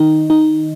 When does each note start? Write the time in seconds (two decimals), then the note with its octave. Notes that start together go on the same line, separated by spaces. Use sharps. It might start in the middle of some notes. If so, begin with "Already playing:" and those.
Already playing: D#3 D#4
0.30 D#4